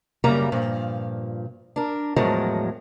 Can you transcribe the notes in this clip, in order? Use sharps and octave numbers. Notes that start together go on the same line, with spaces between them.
F#2 C#3 G3 A#3 A#5
G2 A#2 F3
D4 A#4
E2 A2 F3 F#3 G#3 A#4